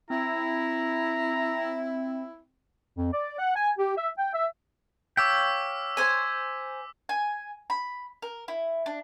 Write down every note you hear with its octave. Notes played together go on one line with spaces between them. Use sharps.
C4 E4 A#5
F2
D5
F#5
G#5
G4
E5
G5
E5
C#5 F5 G5 D6 E6 B6
C5 G#5
G#5
B5
A#4
E4
D4